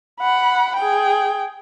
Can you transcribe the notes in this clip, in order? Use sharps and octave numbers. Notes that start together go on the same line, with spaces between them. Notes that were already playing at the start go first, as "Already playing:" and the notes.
F#5 B5
G#4 G5